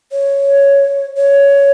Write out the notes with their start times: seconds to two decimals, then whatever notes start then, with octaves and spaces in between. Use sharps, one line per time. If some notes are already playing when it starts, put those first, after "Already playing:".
0.12 C#5
1.17 C#5